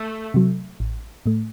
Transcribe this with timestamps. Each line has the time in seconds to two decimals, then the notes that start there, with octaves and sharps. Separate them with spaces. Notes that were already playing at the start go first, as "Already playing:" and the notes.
Already playing: A3
0.34 C3 F#3
0.80 A1
1.26 A2 A3